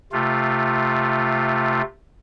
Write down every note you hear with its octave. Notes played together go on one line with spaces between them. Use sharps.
C3 A3 F4